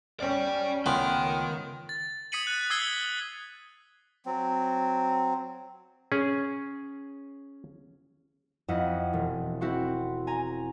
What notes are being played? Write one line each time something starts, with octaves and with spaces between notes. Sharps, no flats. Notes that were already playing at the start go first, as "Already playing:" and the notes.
C#4 D5 G5
C#2 D#3 A3 B3 F4 G5
A6
D#6 G#6 B6 C#7 D#7 F#7
F#6 A6
D#6 E6 G#6 B6 C7 G7
F#3 C4
C#4 G#4
F2 E4 D#5 F#5
E1
C4 E4 F#4 F#5 C6
G#5 A#5